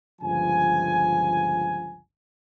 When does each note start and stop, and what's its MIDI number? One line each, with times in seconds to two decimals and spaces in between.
0.22 2.00 31
0.22 2.00 37
0.22 2.00 53
0.22 2.00 80